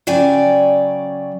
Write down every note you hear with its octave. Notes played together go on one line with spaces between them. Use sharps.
C#3 F#3 D5 G5 G#5